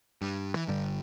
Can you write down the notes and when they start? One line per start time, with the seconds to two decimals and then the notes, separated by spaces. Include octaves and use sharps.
0.21 G2
0.56 E3
0.68 G1 G2 D3 G3